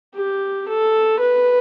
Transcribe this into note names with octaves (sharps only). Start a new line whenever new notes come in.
G4
A4
B4